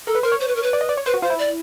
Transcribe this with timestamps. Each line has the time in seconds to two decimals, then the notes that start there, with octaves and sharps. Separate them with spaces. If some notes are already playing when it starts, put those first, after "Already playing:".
0.07 A4 A#4
0.15 B4
0.23 A#4 C5
0.32 C#5
0.40 C5
0.48 B4
0.56 A#4
0.63 B4
0.73 D5
0.81 D#5
0.89 D5
0.97 C#5
1.06 B4 C5
1.14 F#4
1.22 F4 C5
1.30 E4
1.39 D5